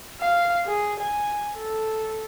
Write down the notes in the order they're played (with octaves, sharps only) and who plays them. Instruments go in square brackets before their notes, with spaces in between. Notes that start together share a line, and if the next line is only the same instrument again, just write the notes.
[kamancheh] F5
G#4
G#5
A4